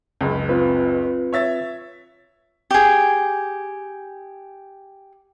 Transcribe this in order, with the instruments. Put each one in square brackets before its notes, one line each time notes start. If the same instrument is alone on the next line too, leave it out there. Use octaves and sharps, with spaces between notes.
[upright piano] F#1 C#2
[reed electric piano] C4 F4 B4
[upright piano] C#5 E5 A6
[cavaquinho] G4 G#4